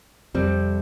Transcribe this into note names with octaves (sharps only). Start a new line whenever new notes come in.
F2 C3 G3 C4